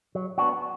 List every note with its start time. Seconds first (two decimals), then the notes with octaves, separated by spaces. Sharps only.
0.15 F#3
0.38 B3 D4 F#4